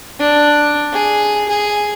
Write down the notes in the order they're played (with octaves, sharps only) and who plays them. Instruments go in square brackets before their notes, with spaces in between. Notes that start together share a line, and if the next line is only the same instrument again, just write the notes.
[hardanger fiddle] D4
G#4
G#4